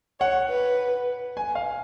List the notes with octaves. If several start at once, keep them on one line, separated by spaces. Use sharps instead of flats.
C#5 F#5
B4
G#5
F5